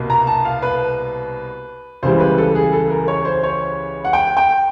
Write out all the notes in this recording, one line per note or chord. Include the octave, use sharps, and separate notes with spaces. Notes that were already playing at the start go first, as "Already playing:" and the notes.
Already playing: C2 B2 A#3
A#5
A5
F5
B4
C#2 C#3 E3 G3 C5
B4
A4
G#4
A4
A#4
C#5
C5
C#5
F#5
G5
G5